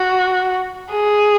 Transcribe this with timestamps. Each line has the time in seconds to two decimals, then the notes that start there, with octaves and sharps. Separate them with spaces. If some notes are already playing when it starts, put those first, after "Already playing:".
Already playing: F#4
0.91 G#4